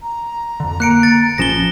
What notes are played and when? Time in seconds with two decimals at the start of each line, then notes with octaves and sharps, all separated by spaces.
0.02 A#5
0.60 F2 D3
0.80 A#3 F#6 C#7 D7
1.03 A6
1.38 A#1 F3 C#4 A#6 E7 G7